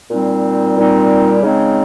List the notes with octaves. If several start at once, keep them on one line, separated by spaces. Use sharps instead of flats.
A#2 G3 C4 D#4
A#2 G3 C4 D#4
C#3 G#3 C4 D#4